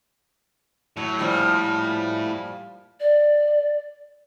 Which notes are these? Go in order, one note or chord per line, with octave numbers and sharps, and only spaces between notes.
A2 F#3
A#2 F3 G3
D5